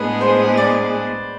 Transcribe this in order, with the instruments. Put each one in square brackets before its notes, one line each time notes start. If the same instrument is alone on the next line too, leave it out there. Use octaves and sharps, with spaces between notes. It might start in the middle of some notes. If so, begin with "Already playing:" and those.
Already playing: [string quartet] A2 G#3 B3 D4 G#4 [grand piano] B4
[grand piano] C5
D5